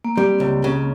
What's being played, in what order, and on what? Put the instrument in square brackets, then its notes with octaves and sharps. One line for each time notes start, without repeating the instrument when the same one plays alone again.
[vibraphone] A#3
[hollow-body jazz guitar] G3 [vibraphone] C4
[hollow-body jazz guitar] C#2
C#3